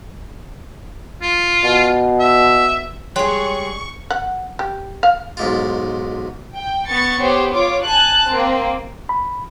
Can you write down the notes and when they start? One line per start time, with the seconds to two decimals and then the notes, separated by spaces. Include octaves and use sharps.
1.22 F4
1.64 B2
2.20 E5
3.16 G3 G#3 G#4 C#5 G5 C6 C#6
4.10 F#5
4.59 G4
5.03 F5
5.37 B1 G#2 F4
6.55 G5
6.89 B3 C#6 A6 C#7
7.22 B3 G4 C5 C#5
7.52 F4 C#5 D6
7.84 G#5 A5 F#6
8.28 A#3 C4
9.09 B5